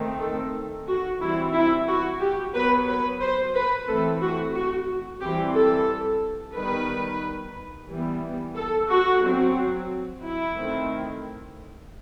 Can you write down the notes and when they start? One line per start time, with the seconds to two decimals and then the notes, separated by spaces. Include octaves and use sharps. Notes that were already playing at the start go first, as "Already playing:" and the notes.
Already playing: D#3 A3 C4
0.20 A4
0.88 F#4
1.21 E3 G3 C4 E4
1.54 E4
1.88 F#4
2.21 G4
2.54 F#3 B3 B4
2.88 B4
3.21 C5
3.55 B4
3.88 E3 A3 C4 A4
4.21 F#4
4.54 F#4
5.21 E3 G3 C4 G4
5.55 A4
6.55 D#3 G3 B3 B4
7.89 E3 G3 B3
8.56 A4
8.89 F#4
9.22 F#3 C4
10.23 E4
10.56 D#3 A3 C4